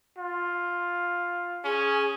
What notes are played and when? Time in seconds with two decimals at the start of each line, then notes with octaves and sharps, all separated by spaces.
0.18 F4
1.65 C#4 G#4